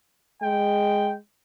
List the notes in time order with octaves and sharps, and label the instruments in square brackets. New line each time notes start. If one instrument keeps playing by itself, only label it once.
[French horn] G#3 [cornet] G5